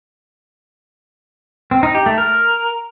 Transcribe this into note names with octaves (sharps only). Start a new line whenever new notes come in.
C4
D#4
G4
A3
A#4